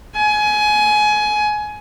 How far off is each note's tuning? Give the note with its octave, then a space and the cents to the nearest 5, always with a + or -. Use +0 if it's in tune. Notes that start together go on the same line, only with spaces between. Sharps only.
G#5 +20